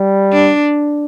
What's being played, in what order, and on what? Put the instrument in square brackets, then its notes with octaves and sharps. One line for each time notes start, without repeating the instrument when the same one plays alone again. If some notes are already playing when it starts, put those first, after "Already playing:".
Already playing: [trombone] G3
[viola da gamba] D4